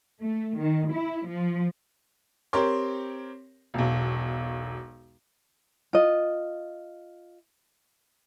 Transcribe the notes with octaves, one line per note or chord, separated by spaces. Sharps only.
A3
D#3
E4
F3
C4 G4 A#4 C#5 C6
E1 B1
F4 D#5